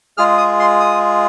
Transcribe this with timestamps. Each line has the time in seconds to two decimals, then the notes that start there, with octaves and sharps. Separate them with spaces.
0.17 G#3 F4 G#4 F6
0.38 D#6
0.60 C6
0.80 D#6